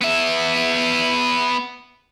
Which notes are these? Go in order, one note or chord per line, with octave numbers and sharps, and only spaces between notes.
B3 E5